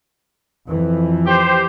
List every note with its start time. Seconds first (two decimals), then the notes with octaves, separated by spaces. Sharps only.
0.70 F2 E3
1.27 G4 C5